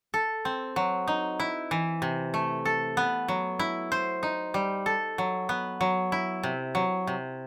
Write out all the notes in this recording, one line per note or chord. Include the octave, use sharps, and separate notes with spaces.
A4
C4
F#3
D#4
E4
E3
C3
A3
A4
B3
F#3
E4
C5
D#4
G3
A4
F#3
B3
F#3
E4
C3
F#3
C3